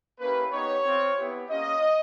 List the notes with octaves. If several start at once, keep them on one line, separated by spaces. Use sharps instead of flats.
A#3 C#4 E4 G4 B4
B3 D#4 G4 C#5
C4 F4
B3 E4 G4
A#3 C#4 F4 D#5